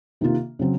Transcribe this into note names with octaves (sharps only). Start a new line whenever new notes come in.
C3 D#3 A#3 F4
C#3 F#3 C4